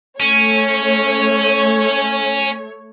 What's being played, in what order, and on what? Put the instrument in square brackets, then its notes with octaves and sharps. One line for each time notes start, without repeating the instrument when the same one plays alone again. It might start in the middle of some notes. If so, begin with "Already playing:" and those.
[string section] A3 C#5 [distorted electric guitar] C#4